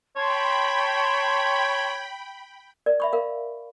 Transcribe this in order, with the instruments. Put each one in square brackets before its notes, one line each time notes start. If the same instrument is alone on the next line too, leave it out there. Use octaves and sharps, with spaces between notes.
[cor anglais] C#5 [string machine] G5 B5 [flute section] A5 C6
[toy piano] A#4 D5
E5 B5 C#6
A#4 F5